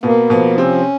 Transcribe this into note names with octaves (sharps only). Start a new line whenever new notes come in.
B2 A#3 B3
B2 F3 B3
C3 C4 C#4